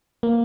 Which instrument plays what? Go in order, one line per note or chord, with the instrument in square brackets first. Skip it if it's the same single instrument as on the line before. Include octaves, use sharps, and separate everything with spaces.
[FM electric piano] A#3